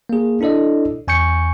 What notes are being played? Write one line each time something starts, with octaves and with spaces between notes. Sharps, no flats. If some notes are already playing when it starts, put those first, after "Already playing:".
A#3 G#4
D4 E4 A4 D5 D#5
E2 G#5 C#6 G6 C#7